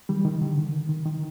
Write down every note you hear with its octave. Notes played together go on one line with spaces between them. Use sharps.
D#3 G3
D#3
D3
D#3
D#3
D#3